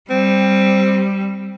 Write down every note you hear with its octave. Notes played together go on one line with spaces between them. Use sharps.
G3 C4